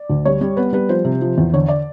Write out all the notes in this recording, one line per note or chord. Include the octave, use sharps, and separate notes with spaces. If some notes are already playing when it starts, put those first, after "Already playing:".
Already playing: D5
D2
G3 C#5
G3
B3 B4
G3 B4
F3 C5
C3
F3
E2
D3 C#5
D5